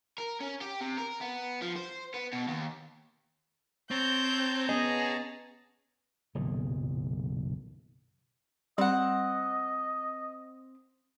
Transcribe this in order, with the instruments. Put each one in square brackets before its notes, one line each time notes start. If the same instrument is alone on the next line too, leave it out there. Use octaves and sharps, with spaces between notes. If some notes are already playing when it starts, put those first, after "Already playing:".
[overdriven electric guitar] A#4
C#4
G4
C3
A#4
B3
F3
C5
B3
B2
D#2
[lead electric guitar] C4 [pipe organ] C#5 A5 A#5 [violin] G6
[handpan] B3 C#4 D#5 [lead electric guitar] G#4
[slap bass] F#1 B1 A#2 D#3
[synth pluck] G3 [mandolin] C4 F#5 [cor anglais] D#5